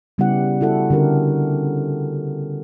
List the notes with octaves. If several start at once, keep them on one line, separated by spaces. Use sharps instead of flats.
C#3 G3 B3 E4 G4 F#5
E4 F#4 A4 F#5
D3 C#4 G4 A#4